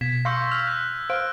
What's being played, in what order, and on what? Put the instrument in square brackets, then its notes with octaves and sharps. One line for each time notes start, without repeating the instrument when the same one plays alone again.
[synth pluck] B2 [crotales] G#6 B6 E7
[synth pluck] F5 C6 C#6 [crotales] E6 G6 A#6
[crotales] E6 [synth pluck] F6
[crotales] F#6 B6
[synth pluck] C5 F5 [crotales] F6 D7